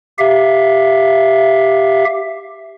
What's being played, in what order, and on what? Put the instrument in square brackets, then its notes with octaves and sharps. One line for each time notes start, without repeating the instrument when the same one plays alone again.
[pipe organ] G4 E5 F5